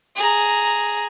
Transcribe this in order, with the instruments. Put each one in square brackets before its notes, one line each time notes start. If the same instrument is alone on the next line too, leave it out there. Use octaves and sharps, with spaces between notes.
[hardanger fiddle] G#4 A#5